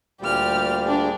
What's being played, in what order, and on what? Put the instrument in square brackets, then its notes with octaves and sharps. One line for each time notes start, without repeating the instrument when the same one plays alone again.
[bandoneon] D2 A#2 G3 [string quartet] G4 F6
[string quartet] D4 G#4